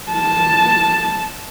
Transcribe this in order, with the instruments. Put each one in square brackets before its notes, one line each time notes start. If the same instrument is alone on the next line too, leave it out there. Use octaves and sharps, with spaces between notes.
[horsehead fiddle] A5